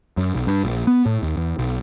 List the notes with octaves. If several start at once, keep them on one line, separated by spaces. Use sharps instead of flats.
F#2
B1
G2
A#1
B3
A2
D#2
E2
B1